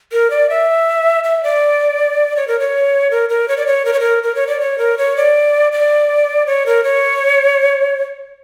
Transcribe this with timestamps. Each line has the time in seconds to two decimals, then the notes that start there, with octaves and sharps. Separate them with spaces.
0.12 A#4
0.30 D5
0.50 E5
1.24 E5
1.43 D5
2.37 C#5
2.48 A#4
2.59 C#5
3.11 A#4
3.29 A#4
3.48 C#5
3.57 D5
3.67 C#5
3.85 A#4
3.93 C#5
4.00 A#4
4.23 A#4
4.35 C#5
4.47 D5
4.60 C#5
4.78 A#4
4.98 C#5
5.17 D5
5.72 D5
6.46 C#5
6.66 A#4
6.84 C#5